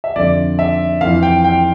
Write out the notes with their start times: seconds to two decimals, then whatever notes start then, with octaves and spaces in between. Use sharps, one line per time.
0.04 E5
0.16 F2 D3 D5
0.59 E5
1.01 F2 E3 F5
1.23 G5
1.44 G5